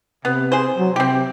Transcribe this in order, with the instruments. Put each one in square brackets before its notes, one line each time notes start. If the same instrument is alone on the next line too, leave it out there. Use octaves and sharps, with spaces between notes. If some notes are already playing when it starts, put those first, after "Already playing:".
[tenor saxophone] C3 [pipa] B3
[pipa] G#4 C5
[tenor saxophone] F#3
[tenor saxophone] C3 [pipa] C4 G4